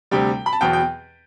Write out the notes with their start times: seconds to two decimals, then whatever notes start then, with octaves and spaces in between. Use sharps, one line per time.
0.11 D2 C3 G3 G5
0.46 B5
0.53 A5
0.61 E2 B2 F#3 B3 G5
0.73 G5